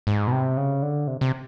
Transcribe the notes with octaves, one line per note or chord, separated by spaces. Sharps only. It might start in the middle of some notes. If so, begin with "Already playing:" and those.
G#2
B2
C3
C#3
D3
C3
C3